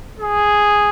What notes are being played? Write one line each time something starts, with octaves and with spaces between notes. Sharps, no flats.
G#4